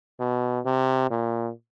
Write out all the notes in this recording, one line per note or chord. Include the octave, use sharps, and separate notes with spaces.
B2
C3
A#2